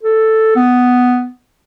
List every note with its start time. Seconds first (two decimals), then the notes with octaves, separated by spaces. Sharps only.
0.03 A4
0.55 B3